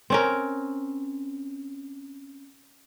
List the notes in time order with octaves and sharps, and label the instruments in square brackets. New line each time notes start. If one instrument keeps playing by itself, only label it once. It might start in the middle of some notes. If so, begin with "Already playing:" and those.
[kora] C4 C#4 A#4